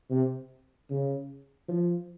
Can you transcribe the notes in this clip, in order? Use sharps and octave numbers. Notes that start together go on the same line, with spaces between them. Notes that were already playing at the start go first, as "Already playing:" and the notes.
C3
C#3
F3